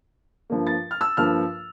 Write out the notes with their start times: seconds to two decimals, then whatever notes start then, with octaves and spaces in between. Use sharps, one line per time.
0.50 G2 F3 A#3
0.67 A6
0.91 F6
1.01 E6
1.17 G2 F3 A#3 F6